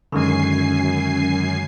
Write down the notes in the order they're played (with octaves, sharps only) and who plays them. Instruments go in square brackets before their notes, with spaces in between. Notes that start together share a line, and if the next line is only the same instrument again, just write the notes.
[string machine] F#2 G#5 C7 [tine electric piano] D3 D#3 G#3 [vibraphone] C#4